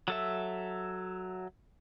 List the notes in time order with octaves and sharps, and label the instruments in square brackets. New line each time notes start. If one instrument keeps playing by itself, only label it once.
[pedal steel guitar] F#3 A4 E5